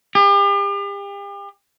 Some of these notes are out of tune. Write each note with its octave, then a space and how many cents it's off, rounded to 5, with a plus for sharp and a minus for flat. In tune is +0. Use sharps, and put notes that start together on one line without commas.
G4 +40